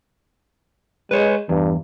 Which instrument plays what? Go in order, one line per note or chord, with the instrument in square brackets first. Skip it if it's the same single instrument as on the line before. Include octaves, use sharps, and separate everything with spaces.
[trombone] G#3 [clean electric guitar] B4 C#5
[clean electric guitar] E2 [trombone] G2